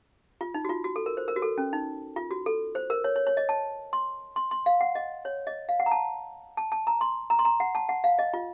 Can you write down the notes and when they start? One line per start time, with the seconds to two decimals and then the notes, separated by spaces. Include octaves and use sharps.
0.41 F4
0.54 D#4
0.65 F#4
0.69 F4
0.84 F#4
0.96 A4
1.06 A#4
1.17 C5
1.28 A#4
1.36 F#4
1.42 A4
1.58 C#4
1.73 D#4
2.16 F4
2.31 F#4
2.46 A4
2.75 C5
2.90 A#4
3.04 C#5
3.16 C#5
3.27 C#5
3.37 D#5
3.49 A5
3.93 C6
4.36 C6
4.51 C6
4.66 F5
4.81 F#5
4.95 D#5
5.25 C#5
5.47 D#5
5.69 F5
5.80 F#5
5.86 A#5
5.91 A5
6.57 A5
6.72 A5
6.87 A#5
7.01 C6
7.30 A#5
7.39 C6
7.45 A#5
7.60 F#5
7.75 A5
7.89 F#5
8.04 F5
8.19 D#5
8.34 F4